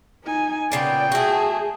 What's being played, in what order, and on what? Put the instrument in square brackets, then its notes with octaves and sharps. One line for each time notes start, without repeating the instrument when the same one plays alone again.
[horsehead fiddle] D#4 G#5
[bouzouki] A#2 C#3 B3 [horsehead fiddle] D5 [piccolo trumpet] G5
[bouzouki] A3 F#4 [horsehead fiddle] G#4